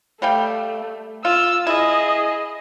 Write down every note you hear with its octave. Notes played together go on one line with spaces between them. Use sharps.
G3 A3 F5 G5
F4 E6
E4 G#4 D#5